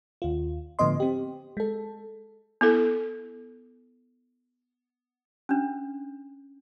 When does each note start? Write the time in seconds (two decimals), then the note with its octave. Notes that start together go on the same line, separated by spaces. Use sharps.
0.22 D#2 F4
0.79 A2 D3 F3 B3 D#5 C6
1.00 C4 G4
1.57 G#3 A4
2.61 B3 E4 A4
5.49 C#4 D4